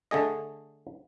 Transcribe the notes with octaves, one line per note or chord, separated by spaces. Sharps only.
D3 A3 G#4 D#5